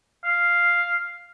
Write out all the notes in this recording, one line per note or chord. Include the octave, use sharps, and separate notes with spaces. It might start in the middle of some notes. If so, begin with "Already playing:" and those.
F5